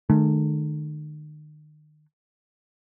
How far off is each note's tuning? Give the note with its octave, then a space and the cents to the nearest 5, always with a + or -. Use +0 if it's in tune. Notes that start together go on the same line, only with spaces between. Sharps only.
D#3 -40 A3 -35